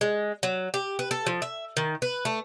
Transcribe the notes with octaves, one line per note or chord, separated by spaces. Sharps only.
G#3
F#3
G4
B4
A4
F3
E5
D#3
B4
A3